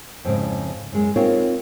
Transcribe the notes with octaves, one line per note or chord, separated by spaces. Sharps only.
F2 G#2 C#3
F#2 G#3
C4 D#4 F4 A#4 C#5